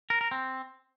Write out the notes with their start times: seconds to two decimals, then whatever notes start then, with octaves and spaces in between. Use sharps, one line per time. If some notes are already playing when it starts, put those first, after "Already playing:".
0.10 A#4
0.21 A#4
0.31 C4